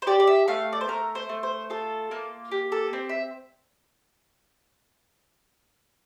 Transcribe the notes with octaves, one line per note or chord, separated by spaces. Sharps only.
C5
G4 D5
D5
E5
A3 F5
D5
C5
A3 A#4
C5
A3
C5
F4 A4
A#3
G4
A4
C4
E5